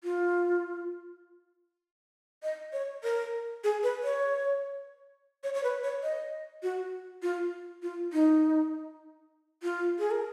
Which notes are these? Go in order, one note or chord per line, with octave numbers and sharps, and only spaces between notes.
F4
D#5
C#5
A#4
G#4
B4
C#5
C#5
C#5
B4
C#5
D#5
F#4
F4
F4
D#4
F4
G#4
A#4